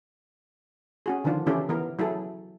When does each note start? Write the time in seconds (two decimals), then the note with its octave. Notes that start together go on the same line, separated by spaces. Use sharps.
1.06 C#4 F#4 G#4
1.24 D3 D#3 F3 D4 F4
1.46 C#3 E3 C#4 E4 G4 A4
1.69 E3 B3 A#4
1.99 F#3 E4 G#4 A4